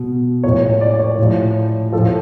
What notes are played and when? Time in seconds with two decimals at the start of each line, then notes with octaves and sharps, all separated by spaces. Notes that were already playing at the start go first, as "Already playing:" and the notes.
Already playing: B2
0.44 A2 F3 C#5
0.63 C#5
0.81 D5
0.99 C#5
1.19 A2 F3
1.92 A2 F3 A4